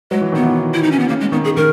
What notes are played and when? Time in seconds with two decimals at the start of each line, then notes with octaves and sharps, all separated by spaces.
0.11 F#3 G#3
0.21 E3
0.32 D#3 B3
0.43 E3
0.74 E4
0.83 D#4
0.91 C#4
0.99 B3
1.08 C#3 A#3
1.21 G#3
1.32 D#3 B3
1.44 G#4
1.57 D#3 A#4